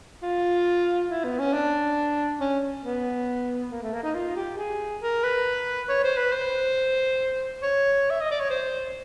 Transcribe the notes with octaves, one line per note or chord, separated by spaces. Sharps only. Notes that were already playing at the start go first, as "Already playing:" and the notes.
F4
E4
B3
C#4
D4
C#4
B3
A#3
A3
A#3
D#4
F4
G4
G#4
A#4
B4
C#5
C5
B4
C5
C#5
E5
D#5
D5
C#5
C5